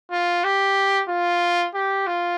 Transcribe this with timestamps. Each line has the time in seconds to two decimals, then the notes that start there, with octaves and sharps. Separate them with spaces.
0.12 F4
0.44 G4
1.09 F4
1.75 G4
2.07 F4